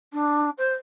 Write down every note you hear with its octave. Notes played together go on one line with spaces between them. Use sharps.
D4
C5